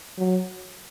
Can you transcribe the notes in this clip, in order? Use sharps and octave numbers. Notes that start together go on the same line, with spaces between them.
F#3